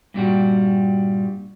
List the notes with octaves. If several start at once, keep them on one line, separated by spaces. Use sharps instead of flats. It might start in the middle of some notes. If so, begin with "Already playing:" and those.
G2 A#2 G3 F#4